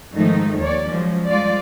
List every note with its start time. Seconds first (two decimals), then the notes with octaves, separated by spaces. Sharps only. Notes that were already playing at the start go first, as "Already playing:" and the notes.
0.13 G#2 D#3 F3 A3 D#4
0.59 D#2 C#5 D5
0.89 F3 F#3 G#3 C#4
1.29 F3 G3 G#3 F4 D5